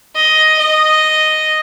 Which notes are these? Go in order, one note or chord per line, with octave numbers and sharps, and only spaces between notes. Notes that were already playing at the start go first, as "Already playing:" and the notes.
D#5
D#5